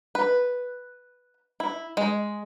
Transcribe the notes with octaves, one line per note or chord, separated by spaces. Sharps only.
B4
E4
G#3